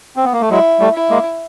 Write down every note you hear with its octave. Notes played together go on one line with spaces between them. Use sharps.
C4
B3
A#3
A3
F#3 G#3 E4
G3 A3
E4
G#3 A#3